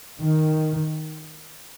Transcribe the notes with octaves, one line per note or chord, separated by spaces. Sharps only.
D#3